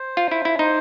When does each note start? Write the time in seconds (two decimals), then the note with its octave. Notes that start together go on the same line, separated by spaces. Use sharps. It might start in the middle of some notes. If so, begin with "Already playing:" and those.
Already playing: C5
0.17 F4
0.31 E4
0.45 E4
0.59 D#4 C5